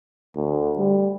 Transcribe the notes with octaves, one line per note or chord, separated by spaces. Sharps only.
D2
G3